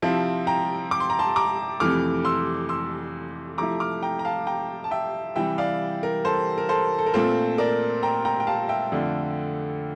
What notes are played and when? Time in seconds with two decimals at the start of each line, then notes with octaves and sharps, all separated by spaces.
0.02 C3 F3 C4 E4 F5 A5
0.47 G5 A#5
0.91 D6
1.00 C6
1.10 A#5
1.19 A5 C6
1.36 A#5 D6
1.80 F2 C3 E3 A3 D6 F6
2.25 C6 E6
2.69 C6 E6
3.58 C3 F3 A3 E4 A#5 D6
3.80 D6 F6
4.02 G5 A#5
4.19 A#5
4.25 F5 A5
4.47 G5 A#5
4.84 A5
4.91 E5 G5
5.36 C3 E3 G3 E5 G5
5.58 D5 F5
6.03 A#4
6.25 A4 C5
6.58 A#4
6.69 A4 C5
6.99 A4
7.06 A#4
7.14 A#2 A3 C4 F4 A4 C5
7.58 A#4 D5
8.03 G5 A#5
8.25 G5 A#5
8.40 G5
8.47 F5 A5
8.69 E5 G5
8.92 F2 D3 A3 D4 F4